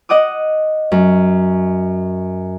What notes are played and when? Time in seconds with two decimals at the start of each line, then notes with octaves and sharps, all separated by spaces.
0.09 D#5 F#5 D6 D#6
0.92 F#2